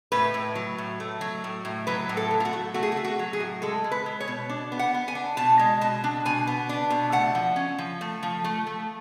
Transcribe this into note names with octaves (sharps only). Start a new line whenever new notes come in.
A2 B4
A2
F#3
A2
A3
F#3
A2
A2
F#3 B4
A2
A4
F#3
F4
F#4
A3
A3 F#4
G#4
F#4
A3
F#4
F#3
G#4
A2
G#3 A4
G#3
B4
G#3
C#5
B2
D4
B3
F#5
B3
G#5
D4
B2 A5
G#3
B2 A5
D4
B2 G#5
B3
D4
B2
A3 F#5
F3
C#4
F3
A3
F3
A3
A3